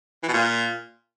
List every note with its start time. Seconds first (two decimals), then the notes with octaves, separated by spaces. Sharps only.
0.23 E3
0.28 B2
0.34 A#2